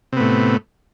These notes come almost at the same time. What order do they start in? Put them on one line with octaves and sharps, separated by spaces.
C3 B3 A2